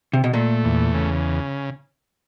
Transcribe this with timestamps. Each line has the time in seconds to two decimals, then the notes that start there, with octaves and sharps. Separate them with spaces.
0.13 C3
0.24 B2
0.33 A#2 A3
0.64 E2
0.94 C#3